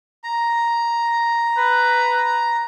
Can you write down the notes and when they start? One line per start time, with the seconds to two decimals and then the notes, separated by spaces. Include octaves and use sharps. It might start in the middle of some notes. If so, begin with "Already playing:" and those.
0.24 A#5
1.57 B4